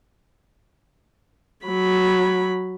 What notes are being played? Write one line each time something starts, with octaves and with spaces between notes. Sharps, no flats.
F#3 B5